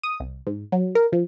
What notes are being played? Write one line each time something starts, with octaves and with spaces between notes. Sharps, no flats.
D#6
C2
G#2
F#3
A#4
F3